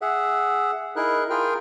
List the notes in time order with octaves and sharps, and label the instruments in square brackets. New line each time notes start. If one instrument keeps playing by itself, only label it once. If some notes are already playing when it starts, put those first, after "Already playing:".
[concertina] G#4 E5 F#5
D#4 E4 G#4 A#4 F#6
F4 G#4 A#4 G5 F6